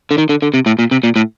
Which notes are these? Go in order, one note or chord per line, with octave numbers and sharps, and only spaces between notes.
D3
D#3
D3
D3
C3
A2
A#2
C3
A#2
A2